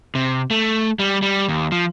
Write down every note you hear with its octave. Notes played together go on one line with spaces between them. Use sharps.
C3
A3
G3
G3
D#2
F3